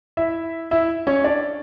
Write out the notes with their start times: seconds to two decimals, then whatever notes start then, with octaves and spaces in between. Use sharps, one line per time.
0.17 E4 E5
0.71 E4 E5
1.07 C#4 C#5
1.24 D4 D5